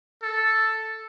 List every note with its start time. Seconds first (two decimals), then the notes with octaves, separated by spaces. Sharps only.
0.23 A4